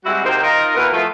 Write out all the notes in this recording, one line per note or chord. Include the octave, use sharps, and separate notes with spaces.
G3 G#3 C4 E4 F#4
C3 D#3 A#3 C4 C5
D#4 F4 A#4
B2 E3 A#3 A#4 B4 F#5
F3 A3 F4